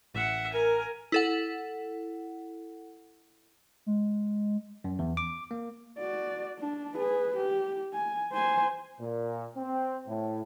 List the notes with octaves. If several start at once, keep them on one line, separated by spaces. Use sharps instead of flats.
A1 E5 F#5
A#4 G#5
E4 A4 F#5
G#3
F#2
E2
D6
A#3
F#4 D5
D4
G#4 B4
G4
G#5
C5 G#5
A#2
C4
A2